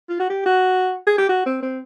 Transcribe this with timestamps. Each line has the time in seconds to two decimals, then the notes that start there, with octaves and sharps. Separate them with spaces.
0.09 F4
0.20 F#4
0.30 G4
0.46 F#4
1.07 G#4
1.18 G4
1.29 F#4
1.46 C4
1.63 C4